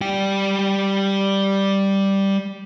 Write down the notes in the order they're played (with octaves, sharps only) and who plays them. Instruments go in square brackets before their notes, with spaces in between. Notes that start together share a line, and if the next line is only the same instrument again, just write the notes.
[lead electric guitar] G3 G5